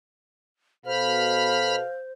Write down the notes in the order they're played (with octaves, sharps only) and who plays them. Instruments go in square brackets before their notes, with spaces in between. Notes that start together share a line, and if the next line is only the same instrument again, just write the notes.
[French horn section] B2 A4 [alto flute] C5 [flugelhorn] F5 [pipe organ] B5 F6